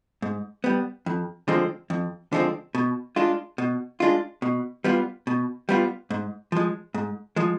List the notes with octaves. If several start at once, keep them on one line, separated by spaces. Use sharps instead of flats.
G#2
G3 B3
F2
D3 F3 G#3 C4
F2
D3 F3 G#3 C4
B2
G#3 D4 F4
B2
G#3 D4 F4
B2
G3 B3 F4
B2
G3 B3 F4
G#2
F3 G#3
G#2
F3 G#3